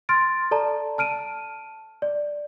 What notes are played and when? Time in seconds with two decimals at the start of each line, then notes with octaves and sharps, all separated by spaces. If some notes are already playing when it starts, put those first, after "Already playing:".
0.09 C6 F6 A6 D7
0.51 A4 D5 A5 A#5
0.98 A5 F6 D7 D#7
2.02 D5